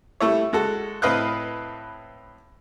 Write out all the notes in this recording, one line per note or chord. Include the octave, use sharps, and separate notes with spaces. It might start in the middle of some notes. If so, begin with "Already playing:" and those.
G3 A3 E4 C#5
G#3 F#4 A4
A2 C4 B4 D#5 F5 F#6